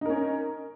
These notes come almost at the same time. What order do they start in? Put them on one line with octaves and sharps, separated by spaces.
D#4 A#4 C#4